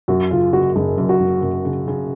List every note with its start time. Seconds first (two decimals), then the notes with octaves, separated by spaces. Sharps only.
0.08 F#2 F#4
0.31 C#3 F4
0.53 F#1 F#4
0.75 F#1 G#4
0.98 F#2
1.09 F#4
1.20 F#1
1.42 F#2
1.65 C#3
1.88 C#3